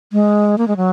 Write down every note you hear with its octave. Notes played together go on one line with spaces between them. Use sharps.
G#3
A#3
G#3
F#3